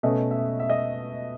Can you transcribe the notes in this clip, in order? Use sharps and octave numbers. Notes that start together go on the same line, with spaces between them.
B2 A3 C#4 D#5
E5
E5
D#5